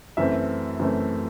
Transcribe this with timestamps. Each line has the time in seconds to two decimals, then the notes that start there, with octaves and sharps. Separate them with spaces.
0.17 F#2 E3 A3 C4 E5
0.79 F#2 E3 A3 C4